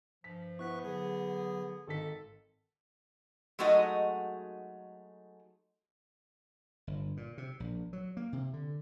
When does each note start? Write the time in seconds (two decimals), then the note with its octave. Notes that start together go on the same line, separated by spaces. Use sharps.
0.24 G2 F3 B6
0.59 B3 E4 C#6 F#6 B6
0.84 D3 F#3 G#4
1.87 G#1 D#3 A4 B6
3.59 F#3 G#3 A3 D#4 F#4 D#5
6.87 G1
7.17 A#2
7.38 C3
7.60 A#1
7.93 F#3
8.17 A#3
8.33 C3
8.53 D3